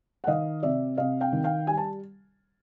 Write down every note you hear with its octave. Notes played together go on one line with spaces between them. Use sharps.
F#5
D#3 D#5 F5
C3 D5 E5
C3 D#5 F5
F5 G5
D#3
F5 G5
G3 G#5
A5